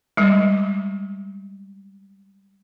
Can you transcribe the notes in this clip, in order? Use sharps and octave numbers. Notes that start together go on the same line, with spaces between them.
G3 G#3